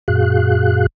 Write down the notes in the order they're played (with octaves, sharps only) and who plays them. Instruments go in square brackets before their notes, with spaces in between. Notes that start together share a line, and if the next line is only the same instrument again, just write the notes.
[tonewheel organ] F#2 A#2 F#4 G#4 F5 F#6